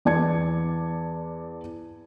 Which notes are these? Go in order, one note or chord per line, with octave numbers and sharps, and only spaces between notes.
E2 D5 A5 G#6 C#7